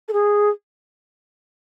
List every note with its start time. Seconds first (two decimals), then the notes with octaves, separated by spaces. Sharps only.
0.08 A4
0.13 G#4